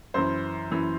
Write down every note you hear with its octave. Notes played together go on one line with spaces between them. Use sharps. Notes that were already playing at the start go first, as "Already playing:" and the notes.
F#2 E3 C5
F#2 E3